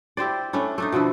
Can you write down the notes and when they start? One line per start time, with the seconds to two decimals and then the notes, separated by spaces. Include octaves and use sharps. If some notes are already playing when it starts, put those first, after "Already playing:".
0.17 E4 G4 C5 D5
0.53 A3 C#4 D4 E4
0.78 A3 D4 D#4
0.92 B2 D3 F3 E4